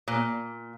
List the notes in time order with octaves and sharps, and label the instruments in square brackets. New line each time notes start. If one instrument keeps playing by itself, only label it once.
[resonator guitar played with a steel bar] A#2